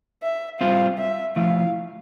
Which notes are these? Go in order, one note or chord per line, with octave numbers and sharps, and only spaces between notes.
E5
G3 C4 F4 C5 F5
E5
F3 A3 E4 F5